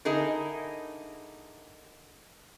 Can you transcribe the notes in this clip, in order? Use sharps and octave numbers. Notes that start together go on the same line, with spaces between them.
D3 D#4 E4 G#4 A#4